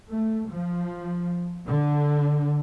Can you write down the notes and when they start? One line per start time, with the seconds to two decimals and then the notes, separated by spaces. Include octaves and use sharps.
0.11 A3
0.50 F3
1.66 D3